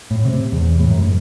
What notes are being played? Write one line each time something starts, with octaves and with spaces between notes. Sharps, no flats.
A2
C3
E2
A2
F#2
F#1